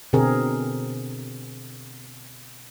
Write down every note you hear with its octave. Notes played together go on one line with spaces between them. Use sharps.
B2 D3 C4 G#4 A#4